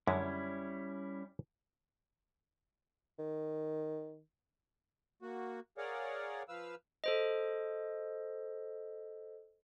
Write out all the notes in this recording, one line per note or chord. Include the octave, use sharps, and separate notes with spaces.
F#2 D3 G3 G#3 C#4 E4
D#3
A#3 F#4
G#4 A#4 C#5 D5 F5 F#5
F3 B4 F5 E6
A4 C5 D#5